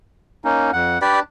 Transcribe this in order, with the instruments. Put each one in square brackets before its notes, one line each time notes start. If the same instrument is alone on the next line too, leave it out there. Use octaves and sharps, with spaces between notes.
[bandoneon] A#3 C#4 D#4
F2 F#5
[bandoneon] D4 [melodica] G4 B4 D5